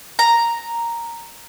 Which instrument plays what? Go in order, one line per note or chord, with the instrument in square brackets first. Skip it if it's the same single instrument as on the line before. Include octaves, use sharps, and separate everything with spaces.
[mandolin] A#5